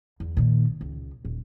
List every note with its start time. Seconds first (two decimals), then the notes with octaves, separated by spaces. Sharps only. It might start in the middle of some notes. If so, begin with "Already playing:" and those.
0.20 E2
0.37 A#2 D#3
0.81 C#2
1.25 D#1